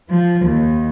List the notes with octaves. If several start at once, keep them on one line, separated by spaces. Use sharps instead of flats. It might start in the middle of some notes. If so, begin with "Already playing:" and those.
F3
D#2